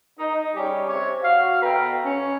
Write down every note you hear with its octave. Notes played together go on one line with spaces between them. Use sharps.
D#4
G3 C#4 G4 G#4
C3 C#5
F#4 F5
B2 A4 B4 G5 A#5
C#4